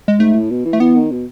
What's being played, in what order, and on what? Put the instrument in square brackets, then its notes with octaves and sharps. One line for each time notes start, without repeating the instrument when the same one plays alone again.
[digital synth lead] G#3
[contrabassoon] G#2 [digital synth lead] A3
[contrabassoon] A2
B2
E3
[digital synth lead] A3
[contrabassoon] E3 [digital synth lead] B3
[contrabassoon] D#3
B2